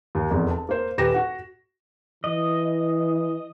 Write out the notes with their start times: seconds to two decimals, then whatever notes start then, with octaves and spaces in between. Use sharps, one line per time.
0.15 D#2
0.31 F1 E2
0.50 A5
0.69 A#3 C5
0.98 D#1 G4 B4 A#6 E7
1.14 F#4 F#5
2.24 E3 D#5